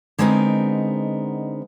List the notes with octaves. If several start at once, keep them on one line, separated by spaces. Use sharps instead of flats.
D3 G#3 B3 C4 D#4 A#4